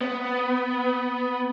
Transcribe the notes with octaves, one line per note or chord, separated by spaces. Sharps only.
B3